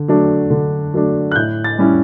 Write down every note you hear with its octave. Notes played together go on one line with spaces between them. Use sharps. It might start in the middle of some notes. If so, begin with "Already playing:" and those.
Already playing: D3
F#3 A3 D4
D3
F#3 A3 D4
F#6
A2 G6
A6
G3 C#4 E4